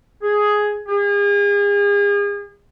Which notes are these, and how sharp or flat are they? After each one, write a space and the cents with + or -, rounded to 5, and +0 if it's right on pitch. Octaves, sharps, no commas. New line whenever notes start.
G#4 +5
G#4 -40